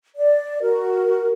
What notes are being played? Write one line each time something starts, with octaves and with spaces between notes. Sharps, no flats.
D5
F#4 A#4